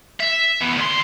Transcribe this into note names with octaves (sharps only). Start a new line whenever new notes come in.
E5
E3 B3
D2 C6